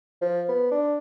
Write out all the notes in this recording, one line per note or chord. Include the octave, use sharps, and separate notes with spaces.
F3
B3
D4